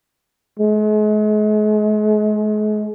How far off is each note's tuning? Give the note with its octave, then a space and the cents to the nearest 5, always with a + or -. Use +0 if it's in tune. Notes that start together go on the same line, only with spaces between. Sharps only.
G#3 +40